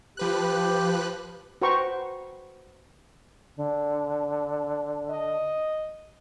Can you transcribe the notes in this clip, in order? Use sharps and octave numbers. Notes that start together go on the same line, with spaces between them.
F3 G4 B4 F#6
F#4 B4 C5 G5 A#5 C#6
D3
D#5